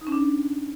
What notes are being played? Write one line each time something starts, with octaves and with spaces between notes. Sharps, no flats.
D#4
C#4
D4